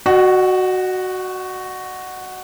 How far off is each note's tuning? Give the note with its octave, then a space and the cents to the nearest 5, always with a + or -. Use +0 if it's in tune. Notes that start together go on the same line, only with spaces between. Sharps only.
F#4 +0 D#5 -45 F#5 +45